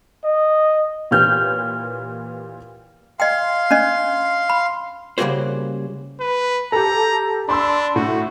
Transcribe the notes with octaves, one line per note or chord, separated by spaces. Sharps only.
D#5
A#2 E3 G4 C#5 F6 G6
D#5 F5 G5 C6
C#4 D4 D#5
B5
C#3 G3 A#3 F#4 G#4 C5
B4
G4 A4 A#5
D4 B5 C6 E6
A2 F#4